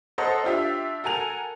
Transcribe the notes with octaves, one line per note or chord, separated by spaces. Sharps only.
A4 C5 C#5 D#5 F#5 A#5
D4 F4 G4 E5
F#4 A4 A#4 G#5 F7